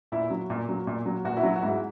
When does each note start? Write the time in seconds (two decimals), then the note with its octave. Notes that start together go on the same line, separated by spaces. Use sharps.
0.12 A#2 E4
0.30 F#3
0.50 A#2
0.69 F#3
0.87 A#2
1.06 F#3
1.25 A#2 F#4
1.37 E4
1.43 F#3
1.56 F#4
1.62 G#2 E4